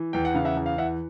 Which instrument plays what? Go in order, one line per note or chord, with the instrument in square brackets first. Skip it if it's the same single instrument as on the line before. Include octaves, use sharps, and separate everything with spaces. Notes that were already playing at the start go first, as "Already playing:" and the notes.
Already playing: [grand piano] E3
E2 G5
F#5
C#3 F5
E5 F#5
E2
F5
E3 E5 F#5